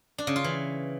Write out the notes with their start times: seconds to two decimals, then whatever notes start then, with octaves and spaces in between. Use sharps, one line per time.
0.18 D4
0.27 C#3
0.36 F4
0.44 E3